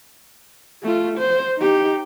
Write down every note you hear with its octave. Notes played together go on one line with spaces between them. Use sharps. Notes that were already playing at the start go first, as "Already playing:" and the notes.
A3 F4
C5
D#4 G4